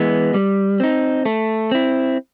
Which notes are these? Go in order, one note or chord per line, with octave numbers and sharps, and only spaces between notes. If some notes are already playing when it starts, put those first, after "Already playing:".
Already playing: E3 G#3 B3
G3
C4 D#4
A3
C4 E4